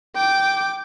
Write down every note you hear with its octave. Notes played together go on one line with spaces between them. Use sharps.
G5 D6